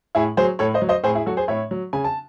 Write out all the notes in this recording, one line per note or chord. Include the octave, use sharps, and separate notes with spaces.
A2 E4 G#4
F#3 G#4 C5
A2 A4 C#5
C5 D#5
F#3
C5 D#5
A2 G#4 C5
E4 G#4
F#3 F#4 A4
G#4 C5
A2 C#5 E5
F#3
C#3 G#5
A5